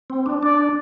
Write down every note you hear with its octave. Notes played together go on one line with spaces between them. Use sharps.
C4
D4
D4 D5